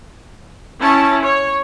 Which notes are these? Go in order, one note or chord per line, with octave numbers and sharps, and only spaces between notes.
C#4 E4 A5
C#5